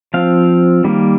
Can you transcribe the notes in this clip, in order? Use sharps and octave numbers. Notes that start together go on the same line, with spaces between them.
F3 C4 F5
D#3 G3 A#3